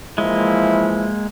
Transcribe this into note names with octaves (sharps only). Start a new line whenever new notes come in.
E3 F3 G#3 A#3 E4